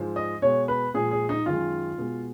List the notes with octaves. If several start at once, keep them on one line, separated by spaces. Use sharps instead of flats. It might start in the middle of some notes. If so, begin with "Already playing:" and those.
Already playing: G#2 F3 G#3
D#5
B2 G#3 C#5
B4
A#2 F3 G#3 G#4
G#4
D#4
F#2 D#3 G#3 F4
B2 G#3